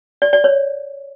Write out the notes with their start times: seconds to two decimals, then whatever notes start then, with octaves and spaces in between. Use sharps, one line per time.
0.22 D5
0.33 D5
0.44 C#5